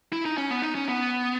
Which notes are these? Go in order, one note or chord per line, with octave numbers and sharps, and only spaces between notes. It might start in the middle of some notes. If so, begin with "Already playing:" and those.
E4
D#4
C#4
B3
D#4
C#4
B3